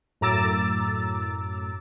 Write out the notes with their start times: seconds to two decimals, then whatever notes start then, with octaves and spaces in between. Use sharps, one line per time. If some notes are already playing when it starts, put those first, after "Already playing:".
0.21 F#2 A2 A#5 D6 E6 A6